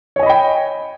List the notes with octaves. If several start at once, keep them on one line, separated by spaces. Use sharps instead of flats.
C#5 D#5 G5 G#5 B5